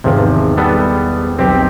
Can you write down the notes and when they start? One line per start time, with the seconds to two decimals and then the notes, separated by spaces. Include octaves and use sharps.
0.04 G#1 E2 C3 F3
0.57 G3 B3 A4
1.39 B1 C4 G4